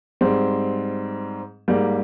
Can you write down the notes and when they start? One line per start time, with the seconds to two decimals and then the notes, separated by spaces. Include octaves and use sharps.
0.21 G#2 G3 C4
1.68 G#2 G3 A#3